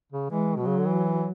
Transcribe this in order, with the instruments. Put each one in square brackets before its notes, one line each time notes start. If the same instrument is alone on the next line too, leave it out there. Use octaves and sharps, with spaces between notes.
[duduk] C#3
[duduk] E3 [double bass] G#3
[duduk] B2 [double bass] F#3
[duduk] C#3
D3
E3